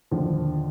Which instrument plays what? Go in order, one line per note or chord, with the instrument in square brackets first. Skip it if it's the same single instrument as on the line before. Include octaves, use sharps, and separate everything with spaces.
[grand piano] D#2 D3 F3